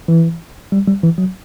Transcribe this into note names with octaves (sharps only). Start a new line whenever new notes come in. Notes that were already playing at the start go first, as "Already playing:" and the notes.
E3
G3
G3
E3
F#3